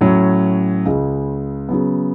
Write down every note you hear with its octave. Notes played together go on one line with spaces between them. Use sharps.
A2 F#3 C#4
C#2 C#3 G#3
C#3 F#3 B3